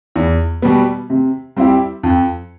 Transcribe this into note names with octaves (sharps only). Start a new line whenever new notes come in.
E2
B2 G3 B3
C3
G3 C4 E4 G4
F2